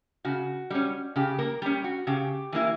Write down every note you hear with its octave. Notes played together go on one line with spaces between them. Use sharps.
C#3 F#4
G3 C#4
C#3 G4
A#3 A#4
G3 C#4 G4
F#4
C#3 G4
E3 A#3 E4